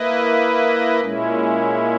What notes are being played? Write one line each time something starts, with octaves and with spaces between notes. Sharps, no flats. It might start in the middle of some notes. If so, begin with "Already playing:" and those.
Already playing: A#3 E4 B4 D#5
A#2 G#3 C#4 E4